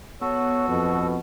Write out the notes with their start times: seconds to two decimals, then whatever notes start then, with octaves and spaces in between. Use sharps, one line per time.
0.21 B3 F#4 A4 C#5
0.69 F2 B2